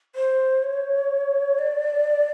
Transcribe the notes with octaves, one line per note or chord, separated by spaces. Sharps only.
C5
C#5
D5